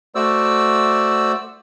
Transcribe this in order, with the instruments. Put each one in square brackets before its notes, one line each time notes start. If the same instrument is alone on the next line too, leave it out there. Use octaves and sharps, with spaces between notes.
[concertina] A3 F#4 C5 D5 E6